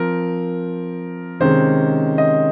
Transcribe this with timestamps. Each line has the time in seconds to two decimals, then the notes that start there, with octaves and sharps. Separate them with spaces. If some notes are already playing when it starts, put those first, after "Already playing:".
Already playing: F3 C4 A#4
1.40 C3 D#3 G#3 C#4 C5
2.18 D#5